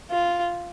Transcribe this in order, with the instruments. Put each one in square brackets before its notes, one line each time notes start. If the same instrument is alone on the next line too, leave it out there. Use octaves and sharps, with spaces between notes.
[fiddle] F4